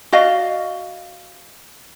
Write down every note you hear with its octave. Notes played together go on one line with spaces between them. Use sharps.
F#4 D5 D#5 F5